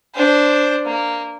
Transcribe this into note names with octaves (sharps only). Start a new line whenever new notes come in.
D4 C5
A#3